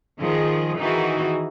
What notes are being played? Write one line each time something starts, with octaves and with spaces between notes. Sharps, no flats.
D#3 F3 G#4 D#5
D#3 E3 D#4 F#4 G#4